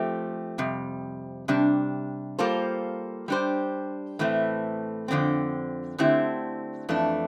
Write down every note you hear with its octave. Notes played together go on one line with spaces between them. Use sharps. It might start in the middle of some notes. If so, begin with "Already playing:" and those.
Already playing: F3 A3 C4 G4
F2 C3 G3
C3 G3 D4
G3 A#3 F4 A4 C5
G3 D4 G4 C5
A2 E3 A3 C4
F2 D3 F3 C4
D3 A3 C4 E4 G4
F2 E3 A3 D4